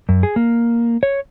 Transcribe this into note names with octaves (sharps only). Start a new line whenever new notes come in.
F#2
G#4
A#3
C#5